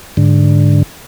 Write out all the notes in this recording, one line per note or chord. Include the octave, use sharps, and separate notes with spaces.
G#2 D3